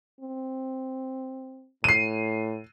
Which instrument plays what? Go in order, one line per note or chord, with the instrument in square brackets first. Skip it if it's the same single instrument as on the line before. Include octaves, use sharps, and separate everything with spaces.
[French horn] C4
[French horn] A2 [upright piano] C7 D#7